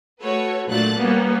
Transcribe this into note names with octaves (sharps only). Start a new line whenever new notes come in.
A3 F#4 A4 B4 C#5
A#2 F#3 A3 D4 F#6 A6
G3 A#3 B3 C#4